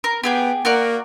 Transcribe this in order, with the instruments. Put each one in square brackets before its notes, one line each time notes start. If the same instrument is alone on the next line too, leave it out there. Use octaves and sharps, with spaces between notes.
[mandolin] A#4
[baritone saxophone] B3 [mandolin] G4 G#4 G5
[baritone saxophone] A#3 [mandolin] F#4 A#4 D5